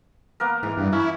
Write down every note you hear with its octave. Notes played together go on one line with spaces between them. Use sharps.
A#3 B3 A#4
G#2 E3
G2
C#4 E4